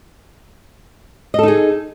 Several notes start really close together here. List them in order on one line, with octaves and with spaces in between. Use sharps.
D#5 A4 D#4 G#4